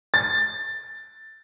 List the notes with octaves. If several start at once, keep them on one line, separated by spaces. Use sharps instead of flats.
A6